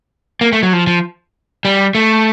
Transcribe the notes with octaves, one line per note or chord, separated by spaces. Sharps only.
A#3
A3
F#3
F3
F3
G3
A3